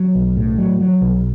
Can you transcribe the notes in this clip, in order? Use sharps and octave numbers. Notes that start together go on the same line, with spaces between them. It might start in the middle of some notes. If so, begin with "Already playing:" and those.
Already playing: F#3
B1
A2
F#3
F#3
B1